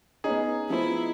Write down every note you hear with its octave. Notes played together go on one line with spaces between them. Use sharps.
B3 C#4 D#4 G#4
F3 B3 E4 C5